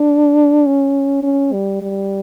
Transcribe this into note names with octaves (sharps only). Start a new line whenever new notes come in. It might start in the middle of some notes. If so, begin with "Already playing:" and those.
Already playing: D4
C#4
C#4
G3
G3